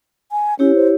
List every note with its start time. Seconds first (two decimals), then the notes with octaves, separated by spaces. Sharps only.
0.32 G#5
0.59 C#4 E4 G4 C#5
0.76 C5